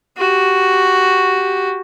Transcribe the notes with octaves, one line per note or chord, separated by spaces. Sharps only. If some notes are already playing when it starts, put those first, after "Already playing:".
F#4 G4